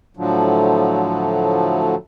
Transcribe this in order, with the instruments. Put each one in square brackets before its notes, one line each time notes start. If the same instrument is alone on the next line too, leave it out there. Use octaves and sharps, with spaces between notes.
[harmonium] A2 D3 F3 F#3